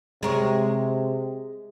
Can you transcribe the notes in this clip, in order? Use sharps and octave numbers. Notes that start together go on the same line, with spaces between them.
C3 G#3 A#4 C#5